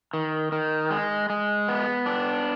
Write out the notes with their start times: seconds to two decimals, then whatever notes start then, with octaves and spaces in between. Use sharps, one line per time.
0.13 D#3
0.52 D#3
0.91 G#3
1.30 G#3
1.68 B3
2.06 D4